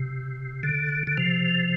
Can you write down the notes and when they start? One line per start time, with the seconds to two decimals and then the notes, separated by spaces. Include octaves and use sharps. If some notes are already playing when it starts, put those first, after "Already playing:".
Already playing: C3
0.63 D3
1.07 D3
1.17 C3 F3